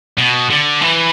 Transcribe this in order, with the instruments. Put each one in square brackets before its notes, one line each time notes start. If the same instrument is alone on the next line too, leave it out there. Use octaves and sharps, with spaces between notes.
[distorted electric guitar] B2
D3
E3